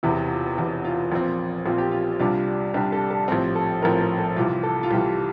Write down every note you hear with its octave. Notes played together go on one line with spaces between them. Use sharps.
E1 E2 C3 E3 E4
F4
E1 E2 C3 E3
F4
A#1 A#2 F3 C4
A#1 A#2 F3 C4 F4
G4
F4
C2 C3 G3 D4 F4
C2 C3 G3 D4 G4
A4
A4
A#1 A2 F3 C4 G4
A4
A#1 A2 F3 C4 A#4
A#4
A4
C2 C3 E3 F4
A4
F4
C2 C3 E3 G4